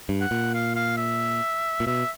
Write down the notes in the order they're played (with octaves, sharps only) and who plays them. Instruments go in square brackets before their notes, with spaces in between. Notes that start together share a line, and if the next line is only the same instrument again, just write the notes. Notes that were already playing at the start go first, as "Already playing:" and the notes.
[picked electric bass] G2
[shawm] F#5
[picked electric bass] A#2
[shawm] F5
F5
E5
[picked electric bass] A#2
[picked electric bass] B2 [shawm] E5